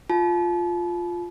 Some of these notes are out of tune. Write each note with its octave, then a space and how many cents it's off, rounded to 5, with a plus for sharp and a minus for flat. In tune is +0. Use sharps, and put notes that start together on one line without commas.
F4 +0 A5 -35